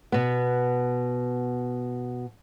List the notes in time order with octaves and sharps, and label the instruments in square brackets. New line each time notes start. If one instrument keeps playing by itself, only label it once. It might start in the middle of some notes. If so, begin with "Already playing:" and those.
[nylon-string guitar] B2 B3